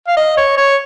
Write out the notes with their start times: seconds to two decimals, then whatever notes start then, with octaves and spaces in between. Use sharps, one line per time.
0.08 F5
0.17 D#5
0.37 C#5
0.57 C#5